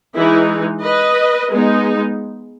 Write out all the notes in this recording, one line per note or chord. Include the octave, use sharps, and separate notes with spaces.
E3 G#3 D#4 E4
B4 D#5
G#3 B3 D#4